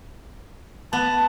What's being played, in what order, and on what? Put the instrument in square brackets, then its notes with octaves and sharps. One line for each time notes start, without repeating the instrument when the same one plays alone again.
[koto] B3 [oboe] A5